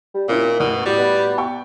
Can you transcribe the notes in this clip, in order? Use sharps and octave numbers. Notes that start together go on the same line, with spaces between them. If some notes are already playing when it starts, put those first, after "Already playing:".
G3
A#2 D#3 C4 C#4 E4
A1 E2 B2
A2 G3 F#4
B3
G5 C#6